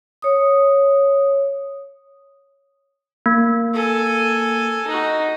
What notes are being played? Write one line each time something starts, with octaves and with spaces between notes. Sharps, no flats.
C#5 D#6
A#3
A4 G#5
D#4 F#4